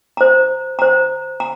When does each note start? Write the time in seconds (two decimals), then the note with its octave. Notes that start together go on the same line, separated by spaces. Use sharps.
0.17 C5 A#5
0.79 C5 A#5
1.40 A#5